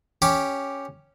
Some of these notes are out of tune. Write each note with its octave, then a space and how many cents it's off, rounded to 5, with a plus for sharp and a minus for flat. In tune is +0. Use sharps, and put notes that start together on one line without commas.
C#4 +0 G4 +0 D6 +0